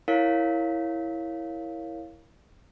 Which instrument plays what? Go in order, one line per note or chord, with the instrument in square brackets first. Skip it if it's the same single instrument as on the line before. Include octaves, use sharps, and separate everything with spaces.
[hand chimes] E4 A#4 C#5 F5 B6